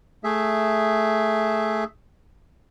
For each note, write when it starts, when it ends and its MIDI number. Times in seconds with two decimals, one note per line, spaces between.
0.24 1.84 57
0.24 1.84 68
0.24 1.84 76